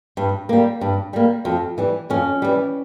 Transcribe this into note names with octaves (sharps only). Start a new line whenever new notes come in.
G2
G3 A#3
G2
G3 A#3
F2
E3 G3
F2 C#4
E3 G3